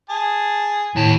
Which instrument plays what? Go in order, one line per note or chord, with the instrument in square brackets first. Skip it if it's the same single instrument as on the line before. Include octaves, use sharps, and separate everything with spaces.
[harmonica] G#4 A5
[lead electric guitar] D#2 A5 [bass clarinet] A2